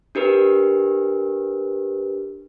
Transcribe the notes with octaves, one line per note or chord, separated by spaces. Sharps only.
D4 G4 A#4 B4